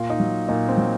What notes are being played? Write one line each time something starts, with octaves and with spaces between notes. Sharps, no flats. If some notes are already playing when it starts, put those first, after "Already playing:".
Already playing: A#2 F4
D#4
F#3
A#2 D#4
C4
F#3